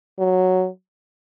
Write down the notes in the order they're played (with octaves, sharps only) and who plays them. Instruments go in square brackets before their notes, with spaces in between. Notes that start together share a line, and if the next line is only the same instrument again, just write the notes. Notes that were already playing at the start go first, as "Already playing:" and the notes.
[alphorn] F#3